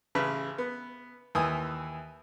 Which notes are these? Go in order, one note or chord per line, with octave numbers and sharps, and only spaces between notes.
A1 C#3 B4
B3
D#2 E3 G#5 D#6